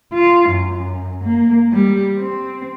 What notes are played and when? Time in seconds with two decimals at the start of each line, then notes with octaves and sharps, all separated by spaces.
0.14 F4
0.50 F#2
1.24 A#3
1.73 G3
2.18 C4